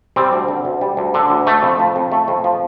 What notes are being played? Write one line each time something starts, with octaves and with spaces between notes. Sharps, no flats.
G3 C4
D2
D3
D2
G3
D2
D3
D2
A3
F2
F3
F2
A3
F2
F3